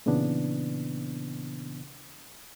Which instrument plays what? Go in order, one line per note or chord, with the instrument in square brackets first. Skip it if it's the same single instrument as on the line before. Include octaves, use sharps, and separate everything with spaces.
[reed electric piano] A#2 C#3 E3 B3 D4